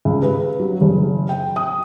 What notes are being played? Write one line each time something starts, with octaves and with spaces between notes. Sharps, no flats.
C#2
B4
F#3
F#1
G5
D#6